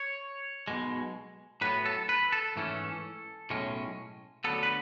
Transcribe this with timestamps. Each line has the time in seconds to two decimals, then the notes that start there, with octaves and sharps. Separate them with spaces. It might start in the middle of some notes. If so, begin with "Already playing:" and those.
Already playing: C#5
0.68 B1 B2 G#3
1.61 A2 F#3 B3 B4
1.86 A4
2.09 B4
2.32 A4
2.56 G#2 E3 A3 C#4
3.50 B1 A2 G#3 C#4
4.44 D2 D3 F#3 B3 A4
4.63 B4